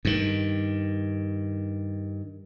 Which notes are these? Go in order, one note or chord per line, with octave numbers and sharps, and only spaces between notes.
G2 D#3